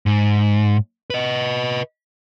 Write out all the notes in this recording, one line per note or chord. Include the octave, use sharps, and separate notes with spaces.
G#2
B4 D#5